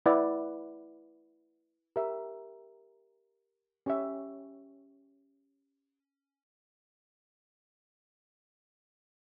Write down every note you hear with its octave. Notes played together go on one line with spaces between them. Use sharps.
E4 B4 D5 F#5
G4 A#4 E5
C#4 G4 C#5 E5